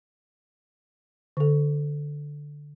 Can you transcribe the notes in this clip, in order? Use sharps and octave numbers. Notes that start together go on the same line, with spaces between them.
D3 A4